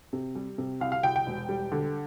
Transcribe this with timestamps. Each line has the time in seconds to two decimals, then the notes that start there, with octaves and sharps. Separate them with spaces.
0.13 C3
0.35 G3
0.58 C3
0.81 C2 F5
0.92 F5
1.03 C2 G5
1.16 G5
1.27 E1
1.49 G3
1.72 D3